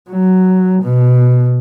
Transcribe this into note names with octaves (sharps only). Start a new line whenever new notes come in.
F#3
B2